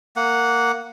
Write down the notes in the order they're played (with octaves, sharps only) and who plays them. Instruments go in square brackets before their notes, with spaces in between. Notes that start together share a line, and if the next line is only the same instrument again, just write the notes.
[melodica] A#3 F#5